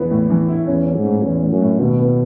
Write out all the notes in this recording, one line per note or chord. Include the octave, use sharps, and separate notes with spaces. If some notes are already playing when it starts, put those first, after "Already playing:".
Already playing: E2 E3 B3 E4
A2
E3
E4
E2 C#4
C#4
G#2
A2
E2 C#4
A2
F#2
A2
D#2 B2
B3